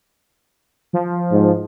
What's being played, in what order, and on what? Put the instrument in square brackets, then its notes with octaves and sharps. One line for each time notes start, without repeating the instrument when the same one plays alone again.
[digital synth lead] F3
[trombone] G#2